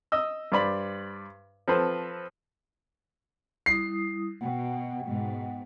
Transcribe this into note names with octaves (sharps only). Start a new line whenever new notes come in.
D#5 E6
G2 C5 D5 B5
F3 C4 A4 B4 C5
G3 E4 D#6 C7
B2 F#5 G5
G#2 B2